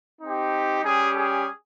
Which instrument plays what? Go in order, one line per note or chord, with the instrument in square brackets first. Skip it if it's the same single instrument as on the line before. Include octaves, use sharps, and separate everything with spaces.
[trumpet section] C4 D#4 G4
G3 C#4 G4 G#4
G#4